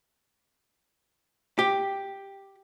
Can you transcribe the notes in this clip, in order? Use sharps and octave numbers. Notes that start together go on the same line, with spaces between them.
G4